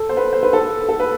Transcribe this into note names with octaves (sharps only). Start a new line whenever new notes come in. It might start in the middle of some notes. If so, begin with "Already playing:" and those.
Already playing: A4
C5
B4
C5
B4
A4
A4
B4